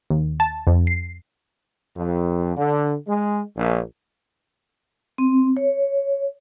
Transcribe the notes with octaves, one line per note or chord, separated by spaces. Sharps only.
D#2
A5
F2
C7
F2
D3
G#3
A#1
C4
C#5